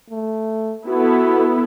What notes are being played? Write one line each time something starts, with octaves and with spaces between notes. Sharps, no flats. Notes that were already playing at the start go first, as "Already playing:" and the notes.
A3
B3 E4 F#4 A4